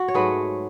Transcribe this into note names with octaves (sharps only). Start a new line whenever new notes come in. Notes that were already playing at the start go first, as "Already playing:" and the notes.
Already playing: F#4
C#5
G#2 F#3 A3 G#4 B4